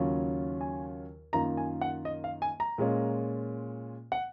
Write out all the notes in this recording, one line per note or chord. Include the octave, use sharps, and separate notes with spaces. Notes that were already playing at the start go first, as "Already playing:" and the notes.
Already playing: D#2 C#3 F#3 C#4 F4
G#5
F#2 D#3 A#3 F4 A#5
G#5
F#5
D#5
F5
G#5
A#5
A#2 G#3 C#4 F4
F#5